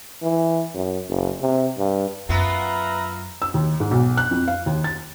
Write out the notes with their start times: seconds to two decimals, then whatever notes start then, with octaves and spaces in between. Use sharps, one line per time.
0.22 E3
0.74 F#2
1.09 F#1
1.42 C3
1.78 G2
2.29 F#2 A#3 B3 F4 B4 E5 A#5
3.42 E6
3.54 D#2
3.80 G#2
3.91 B1
4.17 F#6
4.31 F2
4.48 F5
4.66 D#2
4.84 A6